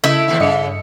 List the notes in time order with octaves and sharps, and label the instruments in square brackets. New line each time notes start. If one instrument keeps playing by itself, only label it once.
[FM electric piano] C#3 D#5 [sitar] A3 E4 [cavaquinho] E5
[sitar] D#2 A2 E4
[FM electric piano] G2 D#5 C#7 [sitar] C#3